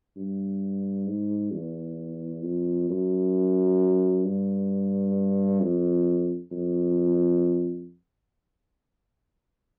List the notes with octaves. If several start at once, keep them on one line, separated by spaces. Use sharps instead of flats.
G2
G#2
E2
F2
F#2
G2
F2
F2